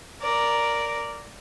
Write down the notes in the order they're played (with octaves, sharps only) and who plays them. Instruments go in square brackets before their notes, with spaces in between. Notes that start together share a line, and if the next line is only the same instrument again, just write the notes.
[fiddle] A#4 D5